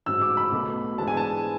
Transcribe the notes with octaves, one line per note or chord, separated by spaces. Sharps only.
A1 G#2 F#3 E6
D6
B5
B1 B2 F#3 A3
G#2 E3 G#3 B3 D4 A5
G#5
A5